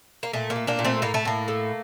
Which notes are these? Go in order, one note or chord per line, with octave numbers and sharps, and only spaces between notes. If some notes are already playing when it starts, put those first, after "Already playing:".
A#3
A#2 A3
A#3
A3
A#3 D4
A#2
A3 C4
A2 A#3
A3
A2 A#3
A3